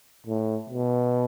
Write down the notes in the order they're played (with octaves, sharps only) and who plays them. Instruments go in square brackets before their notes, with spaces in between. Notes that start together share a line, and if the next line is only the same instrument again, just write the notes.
[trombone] A2
B2